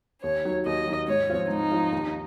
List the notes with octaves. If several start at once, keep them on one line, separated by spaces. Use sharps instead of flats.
D#2 C#5
D#3 F#3
D#2 D#5
D#3 F#3
G#2 C#5
F3 C4 F4
G#2 D#4
F3 C4 F4
D#2